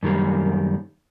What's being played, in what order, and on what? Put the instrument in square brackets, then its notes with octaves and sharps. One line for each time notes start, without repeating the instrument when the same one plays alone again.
[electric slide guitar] F#2 D#3 G3 A#3